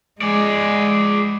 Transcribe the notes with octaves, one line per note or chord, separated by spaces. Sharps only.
G#3 G#4 D5